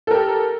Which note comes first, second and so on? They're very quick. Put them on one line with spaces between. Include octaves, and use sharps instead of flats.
A4 A#4 G4